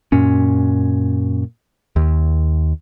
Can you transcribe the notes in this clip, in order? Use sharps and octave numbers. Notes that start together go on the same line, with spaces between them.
F#2 A#2 C#4
D#2